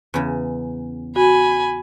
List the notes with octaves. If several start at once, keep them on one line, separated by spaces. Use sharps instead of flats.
E2 C#3
F#4 G#5 B5